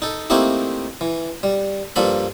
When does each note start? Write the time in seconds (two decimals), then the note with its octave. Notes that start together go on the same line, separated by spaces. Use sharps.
0.02 D#4 A4
0.30 A3 A#3 C4 D#4 E4 G4
1.01 E3
1.43 G3
1.96 G2 F3 A#3 A4 B5